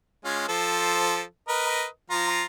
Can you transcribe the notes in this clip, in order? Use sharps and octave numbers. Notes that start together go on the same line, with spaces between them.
G#3 C#4 F4
F3 A4 C5
A#4 B4 D#5
F3 F4 A#5